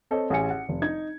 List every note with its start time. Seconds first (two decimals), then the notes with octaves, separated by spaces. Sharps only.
0.11 C4 A4 C5 C#5 D#5
0.30 A1 G#4 F#5 G#5 C#7
0.50 F#5
0.69 F1
0.82 D#4 G#6